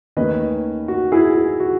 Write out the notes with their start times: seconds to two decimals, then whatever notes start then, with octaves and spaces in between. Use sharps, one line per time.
0.17 D#2 D#3 A3 C#4 B4 D#5
0.88 F#4
1.12 E4 G#4
1.35 E4
1.60 F#4